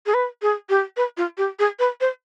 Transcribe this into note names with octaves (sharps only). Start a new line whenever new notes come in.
G#4
B4
G#4
G4
B4
F4
G4
G#4
B4
C5